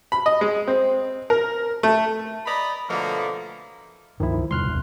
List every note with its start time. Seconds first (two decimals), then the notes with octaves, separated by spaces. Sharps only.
0.12 B5
0.26 D#5
0.41 G#3
0.68 C4
1.30 A#4
1.83 A3
2.46 D5 D#5 A#5 B5
2.89 B2 D3 F3 A3 A#3
4.20 C#2 G2 D#3 F3 E4
4.51 E2 C3 G3 C6 F6 F#6
4.68 G1 D#2 B2